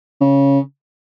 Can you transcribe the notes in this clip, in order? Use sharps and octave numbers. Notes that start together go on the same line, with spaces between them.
C#3